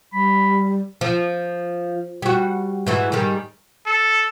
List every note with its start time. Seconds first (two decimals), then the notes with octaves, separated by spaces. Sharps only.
0.13 G3 B5
1.01 F3
2.22 G3 F#4
2.87 G#2 E3 F#4
3.12 G#2 D#3 G3
3.87 A4